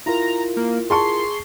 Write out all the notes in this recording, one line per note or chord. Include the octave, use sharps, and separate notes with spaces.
E4 F4 A#4 A#5
A#3
G#4 A5 C6 C#6